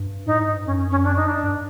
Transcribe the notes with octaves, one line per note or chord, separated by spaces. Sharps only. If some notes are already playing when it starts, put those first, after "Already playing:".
Already playing: G2
A2 D#4
G#2
G2
F#2 C#4
C#4
D4
D#4
D4
G2